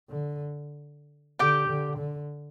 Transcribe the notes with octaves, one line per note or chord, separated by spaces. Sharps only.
D3
D3 G4 G5
D3
D3